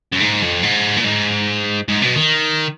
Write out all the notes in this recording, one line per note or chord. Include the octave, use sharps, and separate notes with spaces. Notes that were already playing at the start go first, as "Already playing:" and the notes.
F#2
G#2
F2
G#2
A#2
G#2
G#2
B2
D#3